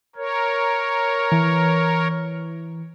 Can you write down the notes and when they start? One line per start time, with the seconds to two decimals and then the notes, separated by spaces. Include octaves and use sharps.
0.16 A#4 C#5
1.32 E3